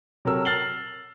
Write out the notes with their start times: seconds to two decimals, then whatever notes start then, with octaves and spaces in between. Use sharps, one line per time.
0.25 C3 F#3 A4 A#4 E6
0.45 F6 A6 C7 F#7 G7